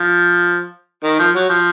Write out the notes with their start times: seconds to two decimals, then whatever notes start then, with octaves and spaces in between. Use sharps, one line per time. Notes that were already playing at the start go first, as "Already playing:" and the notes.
Already playing: F3
1.04 D#3
1.19 F3
1.35 F#3
1.49 F3